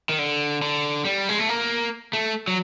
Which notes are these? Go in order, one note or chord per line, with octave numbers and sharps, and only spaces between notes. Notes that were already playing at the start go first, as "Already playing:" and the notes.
D#3
D3
D3
G3
G#3
A3
A#3
A3
F#3